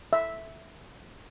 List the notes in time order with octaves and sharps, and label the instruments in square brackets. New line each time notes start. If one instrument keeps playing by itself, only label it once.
[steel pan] E5